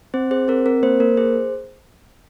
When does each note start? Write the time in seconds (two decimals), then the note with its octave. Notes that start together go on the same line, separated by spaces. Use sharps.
0.14 C4 C5
0.31 G#4 C5
0.48 C4 A#4
0.66 C4 A#4
0.83 A#3 C5
1.00 A#3 A#4
1.17 G#4 C5